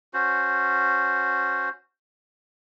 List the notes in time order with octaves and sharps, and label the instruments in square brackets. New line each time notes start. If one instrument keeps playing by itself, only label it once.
[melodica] C#4 F#4 C5